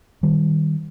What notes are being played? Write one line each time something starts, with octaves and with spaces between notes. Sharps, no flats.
D#3 G3